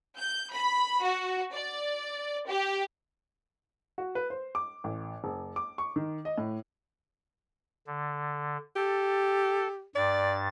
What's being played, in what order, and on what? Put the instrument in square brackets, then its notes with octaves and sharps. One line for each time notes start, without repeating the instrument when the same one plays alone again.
[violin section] G6
B5
F#4
D5
G4
[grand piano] F#4
B4
C5
D6
A1
F#1
D6
C#6
D#3
D#5
A2
[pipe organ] D3
[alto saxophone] G4 [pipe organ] A4
[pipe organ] G2 A6 [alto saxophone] D5